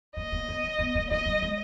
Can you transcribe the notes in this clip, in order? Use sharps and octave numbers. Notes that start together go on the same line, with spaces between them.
A#3 D#5
A#3
B3
C4
B3
A#3
A#3 D#5
G3
G#3